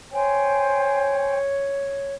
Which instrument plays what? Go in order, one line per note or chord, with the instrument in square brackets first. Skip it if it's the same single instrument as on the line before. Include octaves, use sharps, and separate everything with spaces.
[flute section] C5 G5 G#5 [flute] C#5